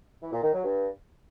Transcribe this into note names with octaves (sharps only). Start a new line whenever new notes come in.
E3
A#2
D#3
F#3
G2